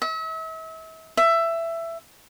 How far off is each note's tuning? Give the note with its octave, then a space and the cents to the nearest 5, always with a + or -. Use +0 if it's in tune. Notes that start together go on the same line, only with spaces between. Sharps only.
E5 -40
E5 +15